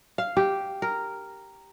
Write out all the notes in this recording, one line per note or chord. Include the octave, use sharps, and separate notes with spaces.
F5
G4
A#4